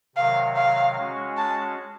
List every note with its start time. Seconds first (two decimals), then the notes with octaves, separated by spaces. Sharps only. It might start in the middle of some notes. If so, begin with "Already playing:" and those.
0.16 C3 D#3 F#3 F5
0.56 F5
0.97 G#3 C#4 F#4
1.37 A5